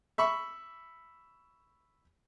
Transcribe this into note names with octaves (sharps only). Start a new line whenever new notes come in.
E5 B5 C#6